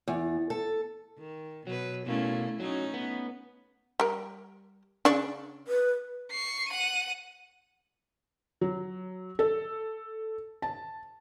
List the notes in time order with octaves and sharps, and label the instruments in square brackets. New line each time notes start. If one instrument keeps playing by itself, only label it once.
[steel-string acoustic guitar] E2
A4
[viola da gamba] D#3
[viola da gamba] B2 B4 [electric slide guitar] F#3
[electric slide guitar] B2 A#3 [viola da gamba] A3 C#4 E4
[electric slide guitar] F#3 [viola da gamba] A3 C#4 D#4
[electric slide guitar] B3
[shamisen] G3 A#4
[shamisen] C#3 D5 [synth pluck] D4 C#6
[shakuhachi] B4
[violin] C#6 C7
F#5 D#7
[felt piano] F#3
A4
A5